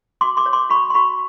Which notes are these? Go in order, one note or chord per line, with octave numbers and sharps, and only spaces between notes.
F#4 C6 D6
C6 D6
C#5
C6 D6
F#4 B5 C#6
C6
F#4 B5 C#6